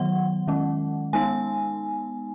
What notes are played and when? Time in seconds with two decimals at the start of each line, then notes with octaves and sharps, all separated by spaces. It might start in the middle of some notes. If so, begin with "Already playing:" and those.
Already playing: D#3 F#3 B3 F#5
0.48 D#3 G#3 C#4
1.13 G#3 B3 D#4 G#5